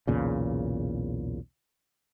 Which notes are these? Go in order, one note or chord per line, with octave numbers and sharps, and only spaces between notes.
B1 E2 A#2 C#3